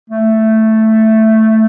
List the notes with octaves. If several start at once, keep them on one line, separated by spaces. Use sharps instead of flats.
A3